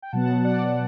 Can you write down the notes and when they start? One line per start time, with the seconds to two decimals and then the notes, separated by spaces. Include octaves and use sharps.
0.02 G5
0.12 B2 F#3 B3 F#5 A5
0.44 D5 F#5